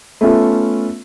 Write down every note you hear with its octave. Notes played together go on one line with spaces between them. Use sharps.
A3 B3 C#4 F4 A4